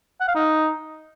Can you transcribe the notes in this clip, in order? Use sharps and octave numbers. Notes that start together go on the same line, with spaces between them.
F#5
F5
D#4